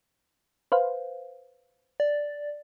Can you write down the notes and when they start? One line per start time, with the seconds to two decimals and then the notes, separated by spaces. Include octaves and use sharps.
0.72 B4 C5 F5
2.00 D5